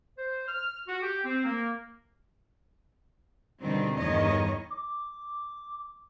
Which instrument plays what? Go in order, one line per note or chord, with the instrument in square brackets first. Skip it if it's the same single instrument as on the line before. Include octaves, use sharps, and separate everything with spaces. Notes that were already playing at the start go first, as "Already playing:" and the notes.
[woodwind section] C5
F6
F#4
G4
C4
A#3
[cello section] B2 D3 D#3 G3 C4
E2 G2 D#3 C#5 D#5
[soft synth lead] D6